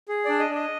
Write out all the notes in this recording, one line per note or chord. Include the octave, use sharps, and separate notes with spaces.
G#4
D4 D5
D#5
D4
D#5